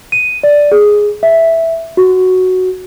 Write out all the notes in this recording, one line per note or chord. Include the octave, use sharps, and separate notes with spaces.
D#7
D5
G#4
E5
F#4